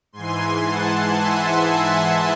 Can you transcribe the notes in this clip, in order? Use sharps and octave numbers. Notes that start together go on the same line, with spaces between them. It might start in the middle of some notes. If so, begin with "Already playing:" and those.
G#2 E3 G#5 C6
F#5 A5
E5 G#5
E5 G#5